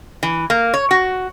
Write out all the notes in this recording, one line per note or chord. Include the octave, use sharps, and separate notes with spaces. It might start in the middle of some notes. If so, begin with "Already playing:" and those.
E3
A#3
C#5
F#4